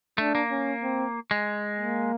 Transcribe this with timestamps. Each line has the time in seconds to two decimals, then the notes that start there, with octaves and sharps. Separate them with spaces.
0.18 A3 D4
0.35 A#3
0.51 C#4
0.83 C4
1.31 G#3
1.80 A#3